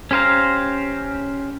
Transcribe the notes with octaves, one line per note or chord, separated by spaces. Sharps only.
C#4 G4 C5 F5 A#5